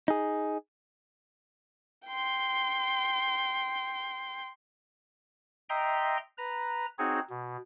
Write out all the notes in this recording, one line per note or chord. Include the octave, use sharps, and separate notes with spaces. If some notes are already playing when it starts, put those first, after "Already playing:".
D#4 G#4
G5 C6
D#5 E5 G5 A#5 C6
B4 A#5
C4 D#4 F#4 G#4 C#5
B2